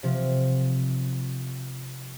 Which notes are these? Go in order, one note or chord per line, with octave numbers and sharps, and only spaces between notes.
C3 F3